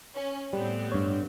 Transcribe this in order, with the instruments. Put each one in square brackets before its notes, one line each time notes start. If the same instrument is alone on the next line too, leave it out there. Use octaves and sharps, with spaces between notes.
[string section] C#4
[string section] A2 B3 C4 [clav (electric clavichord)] G3
[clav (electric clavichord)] G2 C#5